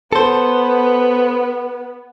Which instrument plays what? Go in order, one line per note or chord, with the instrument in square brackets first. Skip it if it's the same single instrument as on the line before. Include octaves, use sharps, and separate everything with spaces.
[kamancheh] B3 [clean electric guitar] A4 C5